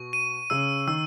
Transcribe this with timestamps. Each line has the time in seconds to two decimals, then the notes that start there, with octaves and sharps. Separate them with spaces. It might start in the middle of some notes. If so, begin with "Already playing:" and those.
Already playing: B2 C#6
0.13 D#7
0.50 C#3 E6
0.87 D#3 E6